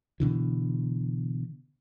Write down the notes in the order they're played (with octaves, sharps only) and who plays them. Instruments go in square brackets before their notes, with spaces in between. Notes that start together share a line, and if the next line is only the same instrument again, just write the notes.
[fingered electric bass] B2 D3 E3